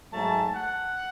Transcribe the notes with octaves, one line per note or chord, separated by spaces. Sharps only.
G#2 F#3 A3 A5
F#5